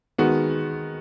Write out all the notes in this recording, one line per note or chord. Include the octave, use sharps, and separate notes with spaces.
D#3 G#3 B3 F#4